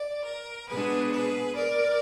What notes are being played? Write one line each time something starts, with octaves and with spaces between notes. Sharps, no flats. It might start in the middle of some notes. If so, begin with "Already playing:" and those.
Already playing: D5
A#4
B2 G#3 B3 D4 G#4 B4
G#4 B4
A#4 D5